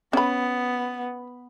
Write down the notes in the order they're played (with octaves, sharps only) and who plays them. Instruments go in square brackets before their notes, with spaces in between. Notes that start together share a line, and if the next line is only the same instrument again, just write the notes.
[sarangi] B3 [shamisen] C#4 B5